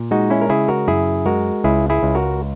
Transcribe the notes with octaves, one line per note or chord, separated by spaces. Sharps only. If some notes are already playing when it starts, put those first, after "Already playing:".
Already playing: A#2
G#3 D#4 F#4
C#4 E4
A#4
C#3 E4 G#4
F#4 A#4
F#2 E4 G#4
G#3 F#4 A#4
C#2 E4 G#4
E4 G#4
C#2
F#4 A#4